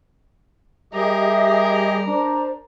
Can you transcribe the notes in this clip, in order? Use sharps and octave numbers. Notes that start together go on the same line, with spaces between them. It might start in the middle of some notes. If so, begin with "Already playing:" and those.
G3 G4 G#4 A#4 D#5 E5
D4 C5 D5 A#5